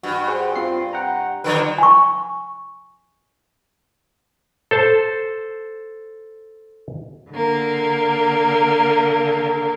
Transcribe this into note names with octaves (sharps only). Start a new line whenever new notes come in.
G2 F#4
G#4 C5 F#5
C4 F4 C7
F#5 G5 A#5
D3 F3 F#3 B4 D5
G#5 C#6
A4 C5 A5
D3 A#3